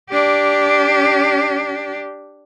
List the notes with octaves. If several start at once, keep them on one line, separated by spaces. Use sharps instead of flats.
D4 G4